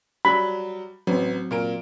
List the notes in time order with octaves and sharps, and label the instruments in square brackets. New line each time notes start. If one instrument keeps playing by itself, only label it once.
[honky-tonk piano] F#3 G3 [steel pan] B5
[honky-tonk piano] A1 [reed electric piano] F#3 C4
[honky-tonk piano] A#2 A#4 D7